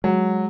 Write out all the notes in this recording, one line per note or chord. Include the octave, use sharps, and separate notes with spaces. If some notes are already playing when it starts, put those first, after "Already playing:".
F#3 G#3